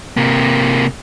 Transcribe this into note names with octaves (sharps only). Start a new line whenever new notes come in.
C3 A#3